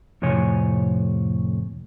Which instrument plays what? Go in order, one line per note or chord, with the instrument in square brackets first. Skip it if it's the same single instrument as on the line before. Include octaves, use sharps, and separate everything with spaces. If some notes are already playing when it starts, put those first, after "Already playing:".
[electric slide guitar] F2 A2 C3 C#5 G#5